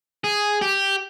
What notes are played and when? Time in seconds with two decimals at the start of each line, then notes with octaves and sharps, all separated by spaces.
0.24 G#4
0.61 G4